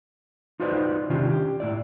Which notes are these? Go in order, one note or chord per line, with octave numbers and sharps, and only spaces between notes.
D#4 F4 F#4 B4 C5 D5
C3 D#3 C#4 D4 F4 G4
G4
A2 E4 D5